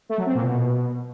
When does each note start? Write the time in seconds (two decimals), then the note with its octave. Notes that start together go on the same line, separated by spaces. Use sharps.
0.09 A3
0.18 F#3
0.26 C4
0.35 A#2
0.43 B2